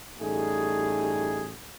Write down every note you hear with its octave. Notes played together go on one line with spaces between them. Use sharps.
A1 G3 A3 D#4 G#4